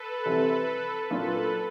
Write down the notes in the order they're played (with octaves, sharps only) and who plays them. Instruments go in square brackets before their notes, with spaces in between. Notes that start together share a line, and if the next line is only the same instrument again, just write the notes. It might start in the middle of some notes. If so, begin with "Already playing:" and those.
Already playing: [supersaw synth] A4 B4
[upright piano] C2 C3 E3 G3 C4
[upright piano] A#2 F#3 A#3 D4 F4 [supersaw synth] A4 B4